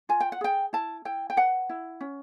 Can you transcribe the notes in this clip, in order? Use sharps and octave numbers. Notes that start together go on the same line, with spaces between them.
F4 G#5
G5
F#5
G#4 G5
E4 A5
E4 G5
G5
B4 F#5
E4
C#4